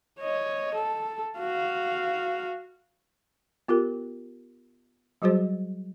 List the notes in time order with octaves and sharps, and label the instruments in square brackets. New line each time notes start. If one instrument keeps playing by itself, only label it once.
[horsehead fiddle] C#5 D#5
A4
F#4 F5
[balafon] B3 F4 G4 A#4
F#3 G3 F#4 G#4 C5